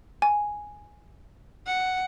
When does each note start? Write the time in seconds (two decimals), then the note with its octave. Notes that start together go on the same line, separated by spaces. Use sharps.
0.22 G#5
1.66 F#5